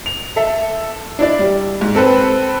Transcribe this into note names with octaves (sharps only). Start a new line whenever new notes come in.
F7
A4 E5
D4 E4 D5
G3
G#2
C4 A4 B4 C5